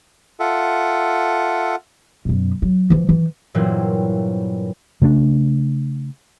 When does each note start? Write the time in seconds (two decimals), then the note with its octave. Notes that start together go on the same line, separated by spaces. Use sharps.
0.40 F4 A4 E5 F#5
2.25 F#2 B2
2.62 F#3
2.90 E3 F3
3.09 E3
3.54 G2 A#2 E3 F#3 A#3 C4
5.02 C#3 A3 A#3 D4